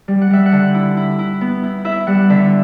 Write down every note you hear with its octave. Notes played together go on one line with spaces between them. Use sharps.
G3
F#5
G3 E5
F#5
D3
E4
E4
E4
B3
E4
E4 E5
G3 F#5
D3 E5